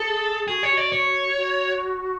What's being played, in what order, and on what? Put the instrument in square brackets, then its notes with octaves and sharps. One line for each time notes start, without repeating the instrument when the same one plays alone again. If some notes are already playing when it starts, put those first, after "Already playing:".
Already playing: [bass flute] G#4 [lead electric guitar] A4
[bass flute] F#4 [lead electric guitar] G#4
[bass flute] G4 [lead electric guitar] C#5
[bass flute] F#4
[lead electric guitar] D5
C#5
[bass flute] F#4